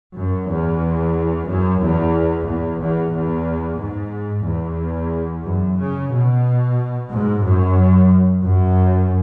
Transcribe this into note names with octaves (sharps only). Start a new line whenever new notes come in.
F#2
E2
F#2
E2
E2
E2
E2
G#2
E2
F#2
C#3
B2
G#2
F#2
F#2